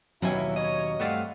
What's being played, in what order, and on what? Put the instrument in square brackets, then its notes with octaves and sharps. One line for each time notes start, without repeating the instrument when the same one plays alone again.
[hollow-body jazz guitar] D#2 B2 G#5 [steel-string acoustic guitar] F#3 C#4 [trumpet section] E4
[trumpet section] C#5 [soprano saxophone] D#5
[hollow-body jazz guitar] G2 A3 D5 [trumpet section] C4 F5 F#5